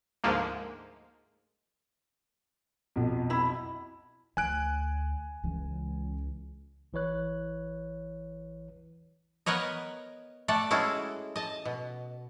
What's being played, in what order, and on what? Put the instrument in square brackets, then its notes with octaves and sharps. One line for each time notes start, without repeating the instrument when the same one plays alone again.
[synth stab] D2 G#2 F3 G#3 A#3
[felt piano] B1 F2
[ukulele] E4 B5
[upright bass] D2 [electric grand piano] G#5 F#6 D7
[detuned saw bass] C#2 [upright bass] E3
[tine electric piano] A1 E3 B4 C#5 F#6
[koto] B3 A#4 B4 C#5 D#5
A3 A4 D5 F#5
G#3 C#4 E4 F#4 G#4 A4
D#5 A5
B2